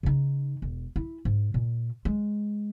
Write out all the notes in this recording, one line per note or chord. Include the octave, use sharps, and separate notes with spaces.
C#3 D#4
E1
E4
G#2
A#2
G#3